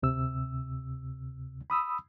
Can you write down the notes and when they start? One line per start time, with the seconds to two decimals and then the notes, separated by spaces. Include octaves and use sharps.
0.03 D2 C3 E6
1.70 B5 D#6 E6